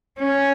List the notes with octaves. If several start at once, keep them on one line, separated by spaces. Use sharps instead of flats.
C#4